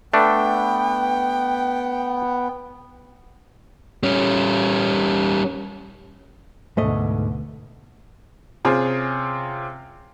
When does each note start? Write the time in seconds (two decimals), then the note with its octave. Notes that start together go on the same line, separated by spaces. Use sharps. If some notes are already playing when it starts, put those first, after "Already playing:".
0.14 A3 B3 D4 G5
4.03 G3 C#4
6.77 D2 G#2 B2 A3 D#5
8.65 C3 C4 C#4 F4 G#4